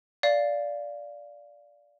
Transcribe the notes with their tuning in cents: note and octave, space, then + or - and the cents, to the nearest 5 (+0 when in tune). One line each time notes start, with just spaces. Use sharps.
D5 -10 F5 +0